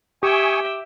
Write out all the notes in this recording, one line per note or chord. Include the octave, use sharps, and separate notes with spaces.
G4 E5 G5 G#5 C#6 D#6